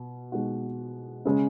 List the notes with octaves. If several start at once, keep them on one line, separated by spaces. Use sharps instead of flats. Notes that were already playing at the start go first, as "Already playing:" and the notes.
Already playing: B2
B2 G#3 D#4 F#4
C#3 G#3 C#4